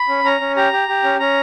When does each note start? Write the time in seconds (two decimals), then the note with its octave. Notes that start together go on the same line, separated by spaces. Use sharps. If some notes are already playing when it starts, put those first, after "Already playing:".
Already playing: B5
0.08 C#4
0.24 C#4 A#5
0.41 C#4
0.56 G4 A#5
0.73 G4
0.88 G4
1.03 C#4
1.19 C#4 A#5